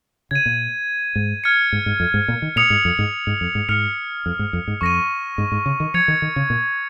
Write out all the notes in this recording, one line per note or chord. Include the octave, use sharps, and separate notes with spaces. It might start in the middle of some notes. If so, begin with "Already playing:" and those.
C#3 G#6 D#7
A#2
G#2
F6 G#6 C#7
G#2
G#2
F2
G#2
A#2
D#3
A#2 D#6 C#7 F7
G#2
F2
G#2
G#2
F2
G#2
G#2 F6 C#7 F7
F2
G#2
F2
G#2
F2 C#6 A#6 D#7
G#2
G#2
C#3
D#3
F3 G#6 C#7 F7
D#3
D#3
C#3
A#2